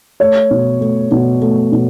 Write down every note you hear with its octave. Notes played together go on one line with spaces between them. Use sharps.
A3 C#5
B2
A3
B2
A3
B2